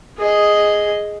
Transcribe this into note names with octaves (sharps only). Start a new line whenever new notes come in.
G#4 D#5